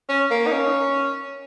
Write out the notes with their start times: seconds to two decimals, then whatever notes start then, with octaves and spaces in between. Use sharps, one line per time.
0.09 C#4
0.31 A#3
0.47 D#4
0.52 C#4